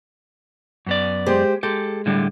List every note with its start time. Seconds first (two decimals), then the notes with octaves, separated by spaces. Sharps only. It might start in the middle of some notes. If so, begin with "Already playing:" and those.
0.86 F#2 B3 D5
1.26 G#3 G4 C5
1.63 G#3 G4 A4
2.06 A2 D3 G3